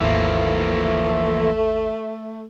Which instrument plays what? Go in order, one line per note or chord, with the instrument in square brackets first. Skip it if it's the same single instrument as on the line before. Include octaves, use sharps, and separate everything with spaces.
[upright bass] G#1 D#2 [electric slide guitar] E3 F3 A#3 [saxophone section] A3